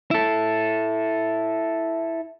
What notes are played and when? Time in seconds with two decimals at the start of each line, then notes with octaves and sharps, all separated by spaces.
0.11 E4 A4